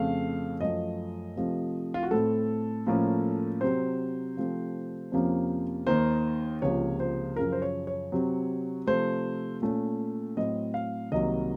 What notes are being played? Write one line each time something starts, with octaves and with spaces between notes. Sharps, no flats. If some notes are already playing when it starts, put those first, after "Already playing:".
Already playing: F2 C#3 A3 F5
F#2 F3 A3 D#5
C3 F3 A3 C4
F4
F#4
A2 A3 C4 A4
A2 F3 A#3 C#4
C3 F#3 C4 C5
C3 F3 A3 C4
F2 C3 F3 A#3 C#4
D#2 D#3 A#3 C5
C#2 C3 F3 A#3 C#4 C#5
C5
F#2 C#3 F3 A#4
C5
C#5
C#5
C3 F#3 C4
C3 F3 A3 C5
A#2 A3 C#4
A2 F#3 C4 D#5
F5
C2 C3 D#3 F#3 A#3 D#5